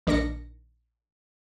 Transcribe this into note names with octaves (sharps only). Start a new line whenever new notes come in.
A#1 D#3 D4 A#4 A#6 C#7